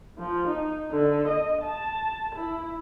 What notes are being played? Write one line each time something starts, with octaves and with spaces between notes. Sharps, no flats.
F3
D#4
D3
D#5
A5
E4